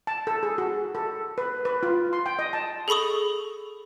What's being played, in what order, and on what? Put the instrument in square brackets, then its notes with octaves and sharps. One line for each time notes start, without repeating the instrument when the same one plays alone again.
[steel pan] A5
A4
G#4
F#4
A4
B4
B4
F4
C6
G5
D#5
A5
[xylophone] G#4 A4 B5 C#6 D#6